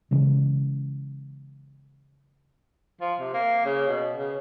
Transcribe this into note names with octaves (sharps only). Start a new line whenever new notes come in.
C#3 E3 G#3
F3
C3
A#3
C#3
B2
C#3